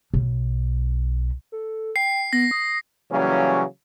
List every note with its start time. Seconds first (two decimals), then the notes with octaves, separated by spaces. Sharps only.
0.14 B1
1.52 A4
1.96 G5 C7
2.33 B3 A#6
2.51 D#6
3.11 C#3 E3 F#3 G3 A#3 C#4